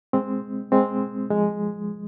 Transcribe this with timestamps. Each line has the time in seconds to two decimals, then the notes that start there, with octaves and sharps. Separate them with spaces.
0.13 G#3 C4
0.72 G#3 C4
1.30 F3 G#3